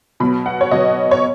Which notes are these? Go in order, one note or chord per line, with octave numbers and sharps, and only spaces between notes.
B2 F#3 B3 B5
F#5
C#5
B2 F#3 B3 D#5
C#5